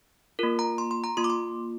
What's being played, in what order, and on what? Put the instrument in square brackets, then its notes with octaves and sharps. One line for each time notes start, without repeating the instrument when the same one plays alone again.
[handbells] A#3 F4 A#4
A#5
C6
C6
A#5
A#3 F4 C6
D6
C6